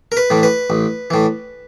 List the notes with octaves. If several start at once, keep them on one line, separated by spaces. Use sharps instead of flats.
A#4
B4
A2 E3
B4
A1
A2 E3